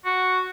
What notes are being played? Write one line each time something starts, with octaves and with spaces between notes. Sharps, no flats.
F#4